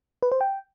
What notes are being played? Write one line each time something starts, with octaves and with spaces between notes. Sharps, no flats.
B4
C5
G5